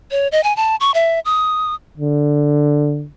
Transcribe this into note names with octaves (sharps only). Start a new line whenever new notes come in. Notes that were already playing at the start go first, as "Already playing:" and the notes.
C#5
D#5
G#5
A5
C#6
E5
D#6
D3